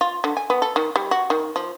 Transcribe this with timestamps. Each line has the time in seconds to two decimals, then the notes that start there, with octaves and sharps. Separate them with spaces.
0.01 F4
0.24 D3
0.37 G#5
0.50 B3
0.62 A4
0.76 D#3
0.96 G3
1.11 F#4
1.30 D#3
1.56 F3